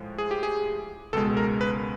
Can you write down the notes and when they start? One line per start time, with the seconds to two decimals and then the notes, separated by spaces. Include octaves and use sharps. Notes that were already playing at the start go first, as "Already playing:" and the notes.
Already playing: A2 F3 G#3
0.18 G#4
0.31 G4
0.43 G#4
1.13 C#2 B2 G#3 A4
1.37 A#4
1.61 B4